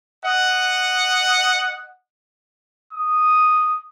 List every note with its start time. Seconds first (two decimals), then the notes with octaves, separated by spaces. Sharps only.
0.25 D#5 F#5
2.93 D#6